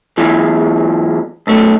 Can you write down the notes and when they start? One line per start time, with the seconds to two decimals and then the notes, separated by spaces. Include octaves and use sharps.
0.17 E2 G#2 E3
1.47 B1 A3